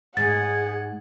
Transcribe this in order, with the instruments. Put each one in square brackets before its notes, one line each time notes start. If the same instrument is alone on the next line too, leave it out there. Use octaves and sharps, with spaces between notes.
[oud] G#2 [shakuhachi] G#4 [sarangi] F#5 [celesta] A6